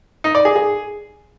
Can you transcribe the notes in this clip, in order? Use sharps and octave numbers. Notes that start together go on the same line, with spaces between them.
D#4
D5
G#4
G#4